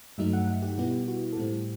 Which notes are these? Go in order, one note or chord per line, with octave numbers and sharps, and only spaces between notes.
G2 F#3 A3 D#4 E5
F#5
F#5
G4
B2 G3 B3 E4 G4
F#4
A4
A2 G3 C4 E4 G4